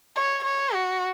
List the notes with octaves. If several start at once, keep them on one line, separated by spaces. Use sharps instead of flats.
C#5
C#5
F#4